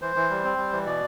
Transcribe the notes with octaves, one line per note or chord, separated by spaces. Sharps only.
E3 C5
E3
G3
C4
G3
E3
B2 D5